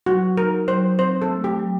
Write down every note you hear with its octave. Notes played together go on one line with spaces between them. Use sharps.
F#3 F#4
D#4 A#4
F#3 C5
C4 C5
A4
A3
G4
F#3